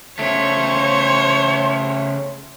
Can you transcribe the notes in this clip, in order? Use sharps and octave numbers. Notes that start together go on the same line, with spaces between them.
C#3 A3 C5 C#5